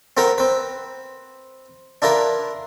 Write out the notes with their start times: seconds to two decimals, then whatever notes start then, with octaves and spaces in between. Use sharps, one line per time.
0.17 C4 F4 A#4 B4 F5 F#5
0.38 C4 B4
2.02 D4 E4 F4 A#4 B4